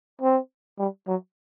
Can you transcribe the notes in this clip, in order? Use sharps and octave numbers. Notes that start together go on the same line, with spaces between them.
C4
G3
F#3